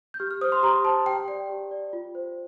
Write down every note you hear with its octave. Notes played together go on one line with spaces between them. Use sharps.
G6
G4 F6
F6
C5 D#6
C6
G4 A#5
C5 A5
G4 G5
D5 G5
G4
D5
F4
C5